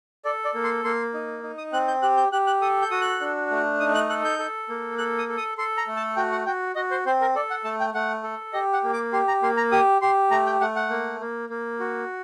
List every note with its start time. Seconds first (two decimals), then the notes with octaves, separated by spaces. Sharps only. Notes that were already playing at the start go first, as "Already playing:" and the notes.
0.25 A4 D5
0.45 D5
0.54 A#3
0.64 C6
0.84 A#3 C6
1.14 D#4
1.43 D#4
1.58 D#6
1.73 C4 F#6
1.88 G6
2.02 G4 F#6
2.17 G6
2.32 G4 F#6
2.47 F#6
2.61 A4 D#6
2.82 G6
2.91 F#4 D#6
3.01 F#6
3.21 D4
3.51 A3
3.80 D#4 D#6
3.95 F#6
4.09 A4 F#6
4.25 G6
4.39 A4
4.69 A#3
4.98 A4 F#6
5.18 D#6
5.29 A4
5.38 D#6
5.58 A4 C6
5.77 A#5
5.87 A3
5.96 A5
6.16 F#4 G5
6.32 F#5
6.46 F#4 G5
6.75 F#4 D#5
6.91 C5
7.06 C4 C5
7.21 A#4
7.35 A4 D5
7.50 F#5
7.64 A3 A5
7.80 G5
7.94 A3 F#5
8.23 A4
8.53 G4 D#5
8.73 F#5
8.84 A#3
8.93 D6
9.12 G4 C6
9.28 A#5
9.42 A#3 C6
9.57 A#5
9.72 G4 D#6
10.02 G4 C6
10.31 A3 A#5
10.46 G5
10.61 A3 F#5
10.76 F#5
10.90 A#3
11.21 A#3
11.49 A#3
11.79 F#4